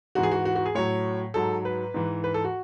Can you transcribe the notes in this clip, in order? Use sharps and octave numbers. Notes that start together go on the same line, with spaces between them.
G#2 E3 F#4
G#4
F#4
F#4
F#4
G#4
A2 F#3 C#5
G#2 F#3 A4
B4
G#2 E3
B4
A4
F#4